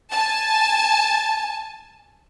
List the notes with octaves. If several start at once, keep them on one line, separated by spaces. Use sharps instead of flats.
G#5 A5